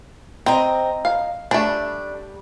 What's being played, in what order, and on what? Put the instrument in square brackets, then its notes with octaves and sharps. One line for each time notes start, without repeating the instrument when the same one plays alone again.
[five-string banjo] C4 [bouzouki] D#5 A#5
[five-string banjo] F5
[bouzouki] G3 [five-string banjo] A3 D4